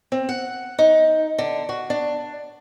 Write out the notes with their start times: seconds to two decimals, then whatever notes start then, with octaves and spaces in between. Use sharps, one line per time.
0.12 C4
0.29 F#5
0.79 D#4
1.38 D3
1.69 F#4
1.90 D4